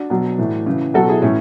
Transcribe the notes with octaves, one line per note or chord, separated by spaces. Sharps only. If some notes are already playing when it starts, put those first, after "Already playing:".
Already playing: D4 F#4
B2 F#3
A2 E3
C#3 E3
B2 F#3 F#4 A4
E4 G#4
A2 E3 C#4 E4